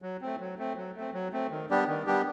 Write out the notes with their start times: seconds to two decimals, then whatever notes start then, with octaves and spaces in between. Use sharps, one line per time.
0.02 F#3
0.21 A3 C4
0.40 F#3
0.58 A3 C4
0.76 F#3
0.96 A3 C4
1.13 F#3
1.33 A3 C4
1.51 D#3
1.70 G3 B3 D4 G4
1.88 D#3
2.07 G3 B3 D4 G4